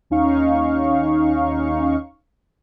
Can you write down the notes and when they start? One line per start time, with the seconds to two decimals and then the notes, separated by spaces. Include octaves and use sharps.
0.10 D#2 C#4 D#4 F5 C#6